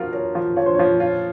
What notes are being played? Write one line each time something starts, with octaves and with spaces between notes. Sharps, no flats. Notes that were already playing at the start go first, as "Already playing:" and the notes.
Already playing: F3 F4 F#4 A#4
A#4 C#5
F3
F3 C#5
C5
F3 C#5
F4 C#5